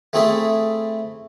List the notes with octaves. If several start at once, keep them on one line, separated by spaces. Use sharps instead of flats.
A3 C4 E4 G#4 A4 E5